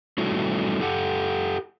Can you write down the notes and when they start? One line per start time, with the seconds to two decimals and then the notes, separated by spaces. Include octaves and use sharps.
0.18 G3 A3 C#4 E4 F#4
0.81 G4 A4 F#5